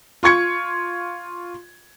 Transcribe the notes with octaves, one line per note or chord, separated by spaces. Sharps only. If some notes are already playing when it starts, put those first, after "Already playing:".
F4 C#6 G#6 C#7